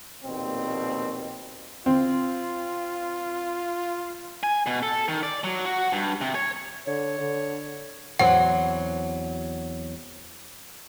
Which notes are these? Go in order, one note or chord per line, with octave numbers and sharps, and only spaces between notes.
A#1 D#2 B2 C4
C4 F4
G#5
B2
A4
D#3
D5
F#3
F#4
G2
C3
C#5
D3 C#5
D3
E2 F#3 C4 F#5